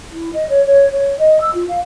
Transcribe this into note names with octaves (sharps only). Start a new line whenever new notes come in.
E4
D#5
C#5
C#5
C#5
D#5
E6
F4
F5